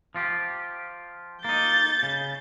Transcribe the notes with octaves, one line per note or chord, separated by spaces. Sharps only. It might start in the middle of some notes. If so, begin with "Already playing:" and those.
F3 F4 G4
A#3 D#4 G6 A6
C#3